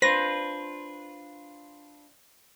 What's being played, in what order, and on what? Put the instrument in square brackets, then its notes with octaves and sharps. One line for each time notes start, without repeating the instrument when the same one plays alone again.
[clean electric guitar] D4 F4 B4 [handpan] C5 [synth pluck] A#6